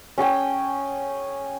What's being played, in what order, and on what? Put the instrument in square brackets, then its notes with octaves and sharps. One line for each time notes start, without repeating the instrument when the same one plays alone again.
[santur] C#4 G#4 G5 G#5